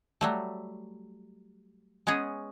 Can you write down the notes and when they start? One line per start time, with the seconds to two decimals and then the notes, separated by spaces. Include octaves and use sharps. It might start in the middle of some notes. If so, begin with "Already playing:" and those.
0.21 F#3 G3 A3
2.07 G#3 B3 C#4 G#4